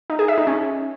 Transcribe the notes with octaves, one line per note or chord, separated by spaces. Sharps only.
D#4
G#4
E5
D#4
C#4